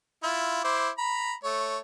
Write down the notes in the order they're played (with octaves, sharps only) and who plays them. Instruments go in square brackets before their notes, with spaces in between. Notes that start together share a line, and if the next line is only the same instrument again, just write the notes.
[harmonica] E4 F4
E4 C5 D6
A#5 B5
A3 C#5